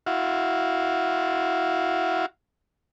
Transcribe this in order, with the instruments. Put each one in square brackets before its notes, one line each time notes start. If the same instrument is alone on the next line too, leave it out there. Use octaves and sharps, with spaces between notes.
[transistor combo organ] E4 F#4 F5